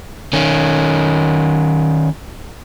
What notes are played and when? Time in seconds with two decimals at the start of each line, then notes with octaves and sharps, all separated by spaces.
0.33 D#3 C#4